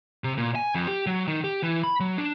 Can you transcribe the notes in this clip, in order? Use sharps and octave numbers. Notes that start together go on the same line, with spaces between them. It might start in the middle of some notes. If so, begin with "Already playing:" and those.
C3
A#2
G#5
F2
G4
F#3
D#3
G4
E3
B5
F#3
D4